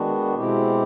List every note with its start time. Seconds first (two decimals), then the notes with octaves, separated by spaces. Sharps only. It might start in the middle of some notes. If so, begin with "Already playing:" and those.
Already playing: D#3 G#3 B3 D4 F#4
0.35 B2 G#3 C4 E4 G4